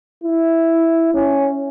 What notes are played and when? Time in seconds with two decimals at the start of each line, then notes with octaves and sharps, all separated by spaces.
0.24 E4
1.14 C#4